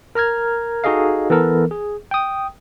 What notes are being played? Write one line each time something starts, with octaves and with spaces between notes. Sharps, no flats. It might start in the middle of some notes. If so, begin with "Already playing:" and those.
A#4 A#5 F6 G#6
D#4 F#4 G#4 A4 D#5 F5
E3 B3 A4 A#4
G#4
G5 D#6